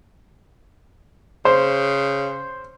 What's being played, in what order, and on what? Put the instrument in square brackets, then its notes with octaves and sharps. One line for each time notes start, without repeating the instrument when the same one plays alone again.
[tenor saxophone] C#3 [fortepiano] C5